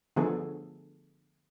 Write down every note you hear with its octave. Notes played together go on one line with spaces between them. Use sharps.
D3 F3 B3 G#4 A4